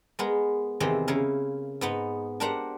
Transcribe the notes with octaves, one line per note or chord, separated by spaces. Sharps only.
G#3 B3 A#4
E2 C3 D#3 E3 C5 D#5
C#3 E4 A#4 F5
G#2 B3 D#4
D4 G4 A#4 C5 F#5 A#5